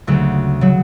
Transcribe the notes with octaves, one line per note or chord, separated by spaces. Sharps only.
D2 C#3 F#3
C#3 F#3